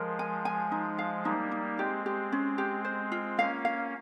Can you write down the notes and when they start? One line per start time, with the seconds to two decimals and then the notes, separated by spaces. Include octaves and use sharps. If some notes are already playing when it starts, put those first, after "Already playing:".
Already playing: F3 G#3 A#4
0.19 G#5
0.45 G#5
0.72 D#4
0.99 F5
1.25 G3 A#3 D#4
1.51 D#4
1.78 G#3 C4 G4
2.06 G4
2.32 C#4
2.58 G4
2.85 C5
3.12 F4
3.38 A#3 C#4 F5
3.65 F5